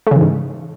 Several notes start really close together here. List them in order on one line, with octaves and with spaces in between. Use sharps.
A3 C#3 E3 G#2